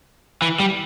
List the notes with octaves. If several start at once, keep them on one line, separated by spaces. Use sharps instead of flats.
E3
G3